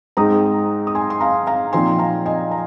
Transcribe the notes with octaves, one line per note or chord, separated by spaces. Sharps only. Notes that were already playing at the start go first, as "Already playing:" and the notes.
G#2 G#3 C4 D#4 A#5 D#6
D#6
G#5 C6
C6
F5 A#5
F5 A#5
A#2 F3 C4 D#4 G#5 C6
F5 A#5
D#5 G#5
A#5